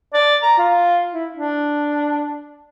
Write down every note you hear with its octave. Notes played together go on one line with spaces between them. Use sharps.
D5
A#5
F4
E4
D4